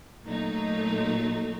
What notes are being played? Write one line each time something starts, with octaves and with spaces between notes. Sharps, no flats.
A#2 F#3 A3 D#4